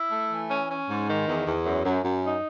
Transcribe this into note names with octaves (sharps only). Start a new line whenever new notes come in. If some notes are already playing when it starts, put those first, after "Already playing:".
Already playing: E4
A3
E3
C#4
C#4
G#2
D#3
E2
E2
F#2
F#2
F#2
D#4